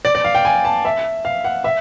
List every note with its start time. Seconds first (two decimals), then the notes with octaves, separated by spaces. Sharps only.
0.05 D5
0.15 D5
0.24 F5
0.35 G5
0.45 G#5
0.65 A5
0.85 E5
1.25 F5
1.44 F#5
1.64 E5